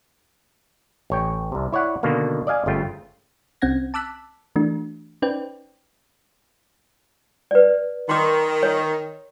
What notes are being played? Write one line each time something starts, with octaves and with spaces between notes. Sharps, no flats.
A1 C#5 G5
C2 C3
E4 C#5 D5 F#5
B2 D3 D#3 A#3
D5 D#5 F5 G#5
G1 C#3 A3 F4 G5
C2 C4 C#4 F#5 G#6 A#6
A5 D6 E6 F#6 B6
E3 A3 D4 F#4
C#4 D#4 B4 C5 D5 G5
B4 D5
D#3 C6 D6
C#5